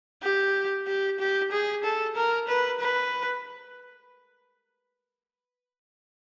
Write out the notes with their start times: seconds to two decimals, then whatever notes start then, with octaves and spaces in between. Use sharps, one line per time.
0.23 G4
0.87 G4
1.20 G4
1.52 G#4
1.84 A4
2.16 A#4
2.48 B4
2.80 B4